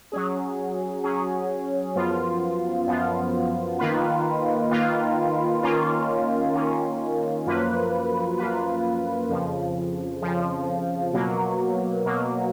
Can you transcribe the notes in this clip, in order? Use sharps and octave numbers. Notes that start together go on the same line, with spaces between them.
F#3 C#4 G#4
F#3 C#4 G#4
F#2 F3 B3 F4
F#2 F3 B3 F4
D#3 A#3 F4 B4
D#3 A#3 F4 B4
D#3 A#3 C#4 F4
D#3 A#3 C#4 F4
F#2 F3 A#3 F4 B4
F#2 F3 A#3 F4 B4
F2 C#3 F3
F2 C#3 F3
B2 F#3 A#3
B2 F#3 A#3